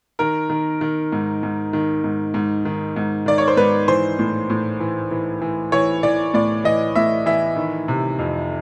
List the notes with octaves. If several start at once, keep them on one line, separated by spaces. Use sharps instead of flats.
D#3 A#4
D#3
D#3
G#2
G#2
D#3
G#2
G#2
D#3
G#2
D#3 D5
C#5
C5
G#2 B4
E3 C5
A2
A2
E3
E3
E3
E3 C#5
E3 D5
A2 D5
E3 D#5
A2 E5
E3 E5
D#3
C3
F2